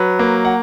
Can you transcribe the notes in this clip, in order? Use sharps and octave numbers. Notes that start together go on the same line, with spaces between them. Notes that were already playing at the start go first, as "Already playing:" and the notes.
Already playing: F#3 B4
A#3
F#5